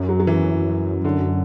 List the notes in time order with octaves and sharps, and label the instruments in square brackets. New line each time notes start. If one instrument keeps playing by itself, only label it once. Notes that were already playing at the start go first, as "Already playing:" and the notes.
Already playing: [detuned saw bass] F#2
[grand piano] F#3
F#3
E3
D3